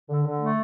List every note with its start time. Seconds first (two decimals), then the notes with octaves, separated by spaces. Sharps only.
0.09 D3
0.25 D3
0.40 A3